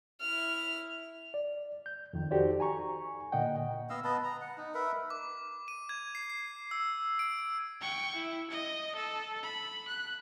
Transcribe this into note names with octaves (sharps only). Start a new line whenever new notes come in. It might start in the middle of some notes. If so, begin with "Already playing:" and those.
E4 F6
D5
G6
F2 D#3
D#4 F#4 G4 A4 C5 D5
G#5 A#5 C#6
A#2 D3 D#5 F#5 G5
B3 D#5 F5 E6
B3 B4 D#5 A5
A#5
F#5
D#4
A#4 B4 E5
D6
D#7
G#6
C7
C7
E6
D7
G5 C#6
E4
D#5
A4
B5
F#6